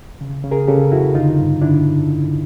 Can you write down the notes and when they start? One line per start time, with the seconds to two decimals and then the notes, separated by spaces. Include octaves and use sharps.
0.21 C#3
0.44 C#3
0.51 G#4 A#4
0.68 C#3 G4 A4
0.92 F2 E4 F#4
1.15 D3 D#4 F4
1.38 G2
1.62 D3 D4 E4